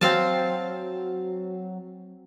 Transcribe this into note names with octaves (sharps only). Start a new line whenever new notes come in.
F#3 C4 F5 A5